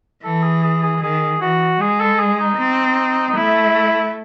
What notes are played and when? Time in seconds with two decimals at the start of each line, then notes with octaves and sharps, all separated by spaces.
0.24 E3 A4
0.43 G#4
0.63 G#4
0.83 G#4
1.02 D#3 G#4
1.41 E3 F#4
1.81 G#3 G#4
2.00 A4
2.19 G#4
2.39 D#4
2.58 C4
3.28 D#4
3.37 A3 E4